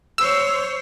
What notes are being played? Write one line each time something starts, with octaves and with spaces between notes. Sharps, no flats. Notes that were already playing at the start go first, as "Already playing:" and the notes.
C5 C#5 E6